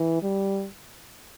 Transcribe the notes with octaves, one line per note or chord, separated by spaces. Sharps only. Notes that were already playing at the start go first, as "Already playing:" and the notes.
Already playing: E3
G3